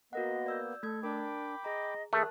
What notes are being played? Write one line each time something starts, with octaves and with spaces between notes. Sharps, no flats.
A#3 B3 F#4 A#4 D#5 F#5
D5 E6 G6
A3 A4 G#6
D4 A#4 G5 B5 D6
G#4 D#5 A#5
D#3 A3 G#4 A#4 A5 F#6